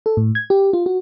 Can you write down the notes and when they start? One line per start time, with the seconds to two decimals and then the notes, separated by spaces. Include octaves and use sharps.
0.06 A4
0.17 A2
0.35 G#6
0.50 G4
0.73 F4
0.86 F#4